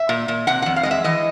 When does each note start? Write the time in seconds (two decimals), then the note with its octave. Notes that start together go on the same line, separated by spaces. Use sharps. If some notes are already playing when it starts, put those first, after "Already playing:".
Already playing: E5
0.09 A#2
0.28 A#2
0.47 C3 F#5
0.62 F2 F#5
0.76 F5
0.83 G#3 D#5
0.91 E5
1.04 E3 D#5